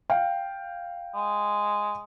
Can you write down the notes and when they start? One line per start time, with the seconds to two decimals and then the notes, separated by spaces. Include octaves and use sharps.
0.10 F5 G5
1.15 G#3